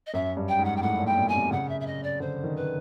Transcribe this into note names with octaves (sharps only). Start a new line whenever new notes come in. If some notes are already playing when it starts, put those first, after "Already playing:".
D#5
F#2 E5
G2
G5
G#2
F#5
G5
A2 F#5
A#2
G5
B2
G#5
C3
C#3 F#5
E5
E5
D#5
D5
D3 C5
D#3
B4